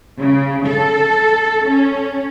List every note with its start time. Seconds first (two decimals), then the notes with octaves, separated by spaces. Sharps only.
0.19 C#3
0.67 A4
1.68 C#4